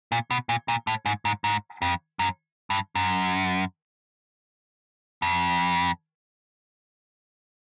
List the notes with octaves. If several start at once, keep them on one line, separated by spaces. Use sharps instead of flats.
A#2
B2
A#2
A#2
A2
G#2
G#2
G#2
F2
F#2
G2
F#2
F2